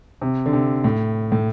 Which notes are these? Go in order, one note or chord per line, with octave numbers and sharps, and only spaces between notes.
C3
D3
C3
A2
A2